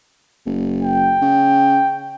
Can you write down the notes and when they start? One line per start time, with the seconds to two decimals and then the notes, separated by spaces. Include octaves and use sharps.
0.46 F#1
0.83 G5
1.22 C#3